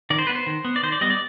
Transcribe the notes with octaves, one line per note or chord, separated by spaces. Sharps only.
D#3 D5
C5
B3 B4
C5
D#3
B3
D5
D#3 C5
D5
G3 B3 D#5
D5